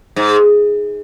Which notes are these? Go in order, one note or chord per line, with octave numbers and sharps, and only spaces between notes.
G#2